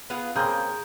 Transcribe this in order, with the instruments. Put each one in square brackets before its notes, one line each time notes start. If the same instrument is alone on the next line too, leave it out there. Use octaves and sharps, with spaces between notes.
[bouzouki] B3 F4 G#4 [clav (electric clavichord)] F#5
[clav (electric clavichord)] C#3 A#3 C4 [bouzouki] G#4 G5 [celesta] A#5 [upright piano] G6